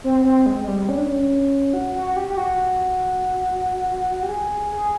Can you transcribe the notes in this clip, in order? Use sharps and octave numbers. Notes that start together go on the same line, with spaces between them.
C4
C4
G#3
G#3
G3
C#4
D4
C#4
F#4
F#4
G4
G4
F#4
G4
G#4
G#4